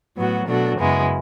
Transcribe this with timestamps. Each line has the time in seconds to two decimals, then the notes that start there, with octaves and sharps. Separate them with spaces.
0.16 A2 F#3 B3 F#4
0.46 B2 F#3 A3 D4 F#4
0.78 F#2 C#3 G#3 B3 E4